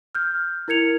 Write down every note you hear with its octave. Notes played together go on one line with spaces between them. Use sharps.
F6 G6
E4 A#4 G#6 C#7 F7